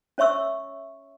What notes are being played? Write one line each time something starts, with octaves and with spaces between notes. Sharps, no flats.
C#4 C#5 E5 C#6 E6